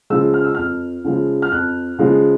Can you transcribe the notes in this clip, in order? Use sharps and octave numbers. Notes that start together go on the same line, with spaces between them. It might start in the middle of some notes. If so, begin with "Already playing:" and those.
C#3 F3 G#3 E6
F6
E6
F2 F6
C#3 F3 G#3
F6
F2 F#6
C#3 F3 G#3